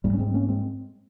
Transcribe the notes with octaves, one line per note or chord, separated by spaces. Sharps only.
G#2 G3 A#3
C#4
G#3 C4
A#3 C#4
G#3 C4